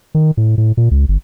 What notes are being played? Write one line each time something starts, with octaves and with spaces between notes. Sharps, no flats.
D#3
A2
A2
A#2
C#2
G1